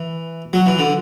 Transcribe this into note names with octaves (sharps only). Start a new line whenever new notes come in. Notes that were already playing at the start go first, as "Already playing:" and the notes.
Already playing: E3
F#3
E3
D3